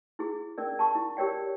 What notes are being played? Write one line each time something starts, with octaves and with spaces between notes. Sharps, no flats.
E4 G#4
C#4 A#4 D5
A5 C#6
E4
G4 A#4 C#5 D5 G5